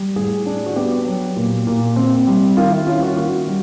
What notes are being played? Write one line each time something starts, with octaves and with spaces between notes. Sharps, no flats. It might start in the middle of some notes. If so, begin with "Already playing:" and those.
Already playing: G3
A2 G#4
D4
F#4
B3 G4
F#3
A#2
A#2
C4
G3
D#3 F4
E4
C#4 F4
F#4
A#3 F#4
G3